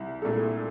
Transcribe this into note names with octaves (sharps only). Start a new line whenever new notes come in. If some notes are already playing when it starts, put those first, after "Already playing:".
Already playing: C2
A#2 A3 D4 A4